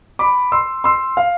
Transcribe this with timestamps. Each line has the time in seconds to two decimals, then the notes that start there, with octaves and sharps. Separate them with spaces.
0.19 B5 D6
0.52 C6 E6
0.84 C6 E6
1.17 F5